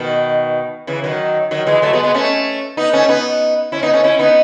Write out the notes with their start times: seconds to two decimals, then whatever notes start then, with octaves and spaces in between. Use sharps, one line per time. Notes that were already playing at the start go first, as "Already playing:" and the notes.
Already playing: B2 D#3
0.87 C#3 E3
1.04 D#3 F#3
1.51 D#3 F#3
1.67 E3 G#3
1.82 F#3 A3
1.93 G#3 B3
2.04 G#3 B3
2.14 A3 C#4
2.77 B3 D#4
2.93 A3 C#4
3.09 B3 D#4
3.72 C#4 E4
3.83 B3 D#4
3.93 A3 C#4
4.04 C#4 E4
4.19 B3 D#4